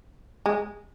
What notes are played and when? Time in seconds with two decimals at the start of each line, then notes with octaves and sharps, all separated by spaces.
0.46 G#3